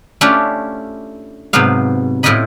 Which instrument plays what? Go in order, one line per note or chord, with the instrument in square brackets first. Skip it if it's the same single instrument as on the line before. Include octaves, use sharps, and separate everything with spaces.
[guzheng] A3 C#4 D4 E4 F4 G4
G#2 C3 F#3 B3 F5
A2 E4 F4 C5 D#5 B5